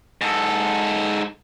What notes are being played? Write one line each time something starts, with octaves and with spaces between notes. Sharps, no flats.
G#2 A4